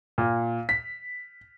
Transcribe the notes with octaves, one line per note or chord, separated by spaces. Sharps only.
A#2
B6